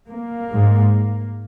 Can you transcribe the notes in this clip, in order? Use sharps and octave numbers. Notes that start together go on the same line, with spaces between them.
A#3
G#2